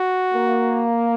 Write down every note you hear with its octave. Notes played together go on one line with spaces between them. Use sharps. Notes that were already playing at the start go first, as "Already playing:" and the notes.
Already playing: F#4
A#3